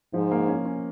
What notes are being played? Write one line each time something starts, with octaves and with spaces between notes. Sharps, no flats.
G#2 F3
A#3
C#4
C#4